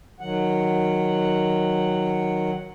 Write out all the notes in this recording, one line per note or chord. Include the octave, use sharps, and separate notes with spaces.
D#3 F#3 F#5